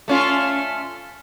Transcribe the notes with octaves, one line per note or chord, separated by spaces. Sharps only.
A3 C#4 F4